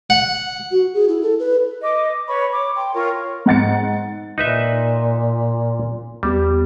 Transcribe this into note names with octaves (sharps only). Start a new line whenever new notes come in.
F#5
F#4
G#4
E4
A4
B4
D#5 D6
B4 C#5 B5 C#6
D6
G5 C6
F4 A#4 C#5 C#6
G#2 F#5 A6 C#7
A#2 D#4 B4 E5
E2 G3 B3 G4